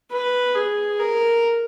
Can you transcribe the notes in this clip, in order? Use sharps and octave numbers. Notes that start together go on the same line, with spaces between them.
B4
G#4
A#4